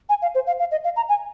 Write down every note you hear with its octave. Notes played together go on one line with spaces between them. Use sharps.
G#5
F5
C5
F5
F5
D#5
F5
A#5
G#5